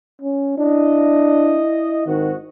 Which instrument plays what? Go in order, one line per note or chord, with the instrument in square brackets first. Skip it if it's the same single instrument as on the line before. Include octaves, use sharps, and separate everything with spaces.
[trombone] C#4
[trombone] D4 [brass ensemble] E4 D#5
[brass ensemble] G#1 C4 F#4 [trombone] D#3